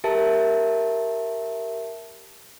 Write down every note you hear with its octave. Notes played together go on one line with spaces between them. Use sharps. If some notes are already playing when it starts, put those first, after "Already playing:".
G4 A#4 E5 A5